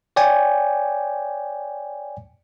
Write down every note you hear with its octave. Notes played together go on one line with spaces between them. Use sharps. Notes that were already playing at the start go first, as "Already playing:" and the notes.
C#5 D5 G5 G#5